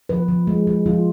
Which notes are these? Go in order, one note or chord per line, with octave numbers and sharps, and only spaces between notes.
F3 B4
F3
G#3
G#3
F3 F4